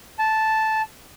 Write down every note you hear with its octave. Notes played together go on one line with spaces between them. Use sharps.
A5